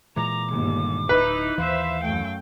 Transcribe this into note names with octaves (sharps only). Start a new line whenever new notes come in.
A#2 E3 G#3 A#5 D6
G1 D#2 A#2 D#3 G#3
D1 D#4 E4 B4
D#2 E3 C5 E5 F5
F#2 A3 G5